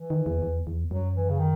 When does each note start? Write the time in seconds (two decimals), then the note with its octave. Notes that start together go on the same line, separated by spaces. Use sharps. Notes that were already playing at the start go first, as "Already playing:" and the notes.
Already playing: E3
0.10 D#3
0.26 E2
0.42 E2
0.67 E2
0.91 F#2 F#3
1.15 E3
1.29 C#3
1.39 D#3